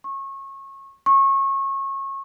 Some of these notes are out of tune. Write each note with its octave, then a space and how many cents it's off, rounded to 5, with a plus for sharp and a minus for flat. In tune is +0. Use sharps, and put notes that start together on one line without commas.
C#6 -25
C#6 -25